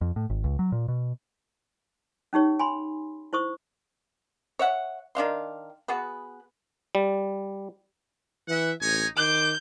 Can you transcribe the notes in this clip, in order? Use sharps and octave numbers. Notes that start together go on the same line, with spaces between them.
F2
A2
G#1
C#2
F#3
A#2
B2
C#4 D#4 G4 C#5
G#5 B5 C6
E4 C5 C#6 D#6
C#5 E5 F#5
D#3 D4 F5 C6
B3 F#4 G#4 B4
G3
E3 E5 F#5
A1 D#4 C#5 G#5
D#3 C5 D6 G6